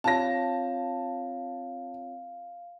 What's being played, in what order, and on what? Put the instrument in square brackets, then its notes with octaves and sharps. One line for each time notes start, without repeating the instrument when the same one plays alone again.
[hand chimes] C4 F4 C#5 [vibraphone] F5 [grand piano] A5 A#6